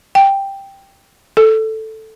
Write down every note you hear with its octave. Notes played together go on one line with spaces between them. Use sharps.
G5
A4